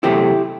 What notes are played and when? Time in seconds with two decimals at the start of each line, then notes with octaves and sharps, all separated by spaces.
0.03 E2 C3 F#3 A3 E4 G4